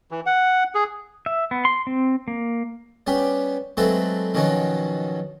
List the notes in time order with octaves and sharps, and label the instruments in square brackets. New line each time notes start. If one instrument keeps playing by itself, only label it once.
[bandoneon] E3
F#5
G#4
[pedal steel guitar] E5
B3
C6
C4
A#3
[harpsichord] G3 B3 C#4 G4
F#3 G#3 A3 C4 A4 B4
B2 D#3 F3 F#3 C#4 D#4